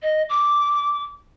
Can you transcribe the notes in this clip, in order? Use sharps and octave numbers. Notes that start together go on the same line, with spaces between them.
D#5
D6